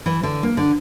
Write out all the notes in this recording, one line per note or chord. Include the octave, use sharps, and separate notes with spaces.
E3
D3
A#3
D3